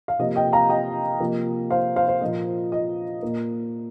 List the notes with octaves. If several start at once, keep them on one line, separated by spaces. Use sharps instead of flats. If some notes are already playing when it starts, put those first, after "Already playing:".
F5
C3 F3 A#3 D#5
D#5 G5
F5 A#5
D#5 G5
C3 F3 A#3
C5 F5
C5 F5
C5
A#2 F3 A#3 D#5
D#5
A#2 A#3